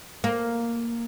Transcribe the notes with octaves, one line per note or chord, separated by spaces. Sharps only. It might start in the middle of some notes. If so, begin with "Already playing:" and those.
A#3